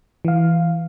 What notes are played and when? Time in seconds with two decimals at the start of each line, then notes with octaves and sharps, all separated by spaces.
0.25 E3 F5